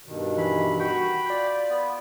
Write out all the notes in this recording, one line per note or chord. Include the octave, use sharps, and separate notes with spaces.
G2 B2 D#3
E3 B5
F#4 G5 B5
F4 D5
B3